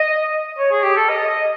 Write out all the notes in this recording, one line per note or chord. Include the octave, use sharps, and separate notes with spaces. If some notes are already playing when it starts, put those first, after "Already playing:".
Already playing: D#5
C#5
G#4
G4
A4
D#5
D#5